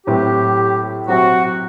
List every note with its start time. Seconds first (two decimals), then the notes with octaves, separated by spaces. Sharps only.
0.07 A2 F#3 C4 E4 G4 B4
1.08 F#3 C4 F#4 G4 C5 E5